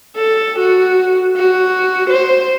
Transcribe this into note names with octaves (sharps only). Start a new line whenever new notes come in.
A4
F#4
F#4
C5